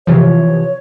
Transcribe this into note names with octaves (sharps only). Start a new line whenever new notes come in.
C3 E3 F3 C#5